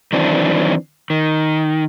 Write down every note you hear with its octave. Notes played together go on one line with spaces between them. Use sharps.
D#3 E3 F#3 C4 D4
D#3